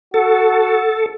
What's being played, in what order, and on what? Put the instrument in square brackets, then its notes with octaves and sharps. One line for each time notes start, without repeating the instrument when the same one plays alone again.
[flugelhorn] F#4 [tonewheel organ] A4